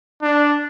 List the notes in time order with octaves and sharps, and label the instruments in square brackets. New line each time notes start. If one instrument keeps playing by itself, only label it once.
[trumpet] D4